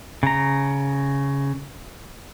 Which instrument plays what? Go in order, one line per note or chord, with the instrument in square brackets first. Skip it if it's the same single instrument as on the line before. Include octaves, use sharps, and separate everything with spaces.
[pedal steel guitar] C#3 A#5